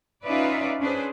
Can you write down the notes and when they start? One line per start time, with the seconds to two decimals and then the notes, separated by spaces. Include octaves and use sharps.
0.23 C#4 D#4 F4 B4 D5 E5
0.80 C#4 D4 G#4 B4 C5